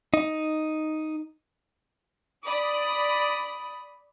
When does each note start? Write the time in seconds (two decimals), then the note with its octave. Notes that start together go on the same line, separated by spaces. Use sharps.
0.14 D#4
2.46 D5 B5 D#6